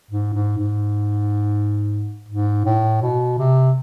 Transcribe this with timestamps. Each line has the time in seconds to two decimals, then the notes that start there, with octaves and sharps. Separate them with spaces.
0.11 G#2
0.34 G#2
0.58 G#2
2.28 G#2
2.65 A2
3.02 B2
3.38 C3